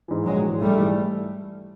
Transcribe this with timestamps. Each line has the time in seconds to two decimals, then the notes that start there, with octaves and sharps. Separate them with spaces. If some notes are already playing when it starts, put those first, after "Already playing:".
0.08 G#2 E3
0.25 A#1 F#3 G#3
0.43 G#2 E3
0.60 A#1 G3 A3
0.78 G#2 E3